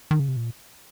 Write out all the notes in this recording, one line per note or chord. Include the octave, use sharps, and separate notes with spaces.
D#3
C#3
C3
A#2